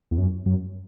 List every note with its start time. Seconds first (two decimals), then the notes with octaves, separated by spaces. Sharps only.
0.11 E2
0.18 F#2
0.46 F#2